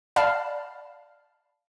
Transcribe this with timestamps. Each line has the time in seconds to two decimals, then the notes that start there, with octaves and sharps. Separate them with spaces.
0.16 D5 F5 A5 B5 F6